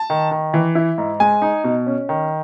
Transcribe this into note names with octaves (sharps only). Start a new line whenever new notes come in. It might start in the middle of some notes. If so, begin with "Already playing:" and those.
Already playing: A5
D#3
D#3
E3
E4
G#2
G#3 G#5
D#4
B2
C#4
D#3